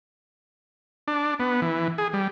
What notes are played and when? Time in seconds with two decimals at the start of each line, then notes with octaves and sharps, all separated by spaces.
1.08 D4
1.40 B3
1.62 E3
1.98 G#4
2.13 G3